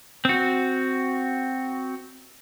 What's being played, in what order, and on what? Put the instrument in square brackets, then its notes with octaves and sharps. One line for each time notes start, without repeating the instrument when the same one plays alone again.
[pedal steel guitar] C4 F#4